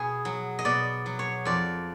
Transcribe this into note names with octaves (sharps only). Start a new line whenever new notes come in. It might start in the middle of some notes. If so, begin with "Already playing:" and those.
Already playing: B2 G#4
F#3
D#5
B2 D5
F#3
C#5
F2 D5